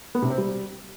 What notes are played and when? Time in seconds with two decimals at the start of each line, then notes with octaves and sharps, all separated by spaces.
0.15 B3
0.22 C3
0.30 C4
0.38 G3